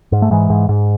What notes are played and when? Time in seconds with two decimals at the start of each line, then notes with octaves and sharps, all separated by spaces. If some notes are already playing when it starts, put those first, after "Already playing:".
0.12 G#2
0.22 A3
0.31 G#2 E3 G#3
0.50 G#2
0.69 G#2